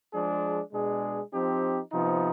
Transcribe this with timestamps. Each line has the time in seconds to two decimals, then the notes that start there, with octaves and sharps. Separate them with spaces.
0.13 F3 G#3 D4 G#4
0.72 B2 G#3 D4 G#4
1.32 F3 C4 D#4 G4
1.92 C3 F3 B3 D#4